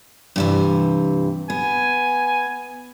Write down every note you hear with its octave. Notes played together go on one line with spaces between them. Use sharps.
G2 C3 E3
B3 G#5